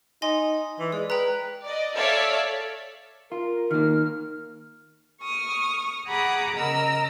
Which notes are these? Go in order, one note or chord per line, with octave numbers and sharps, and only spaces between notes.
D#4 G#5 C6 A#6
E3
G#3 D5
B4 G5 A#5
D5 D#5
A4 C#5 D5 E5 F5
F4 A#4
D#3 A#3 F6
C#6 D#6 F6
G#4 F#5 A#5 B5 D6 D#6
C#3 A#4 D#5 A#5 E6